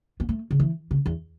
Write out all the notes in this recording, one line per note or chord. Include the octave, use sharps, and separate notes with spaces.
B3
A3
C#3
E3
C#3
E2